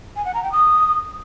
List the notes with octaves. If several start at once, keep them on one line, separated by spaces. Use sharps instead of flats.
G#5
F#5
A#5
G5
D#6